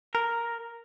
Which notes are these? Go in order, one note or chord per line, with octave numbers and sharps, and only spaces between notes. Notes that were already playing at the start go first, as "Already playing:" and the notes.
A#4